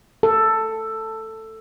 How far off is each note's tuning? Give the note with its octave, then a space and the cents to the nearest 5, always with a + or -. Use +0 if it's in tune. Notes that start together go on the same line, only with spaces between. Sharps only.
A4 +10